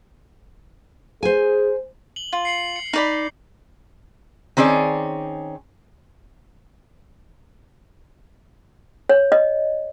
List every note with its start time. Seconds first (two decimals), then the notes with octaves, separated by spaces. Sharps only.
1.23 G#4 C5 G#5
2.16 F#7 G7
2.33 F4
2.45 C7 C#7 F#7
2.76 C#7
2.93 D#4 D5 B5
4.57 D#3 C4 C#4 G#4 D5
9.09 C#5
9.32 D#5